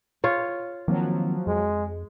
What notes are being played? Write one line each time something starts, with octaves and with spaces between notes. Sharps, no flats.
F4 C#5
D#3 F3 F#3 A#3 C4
F2 G#3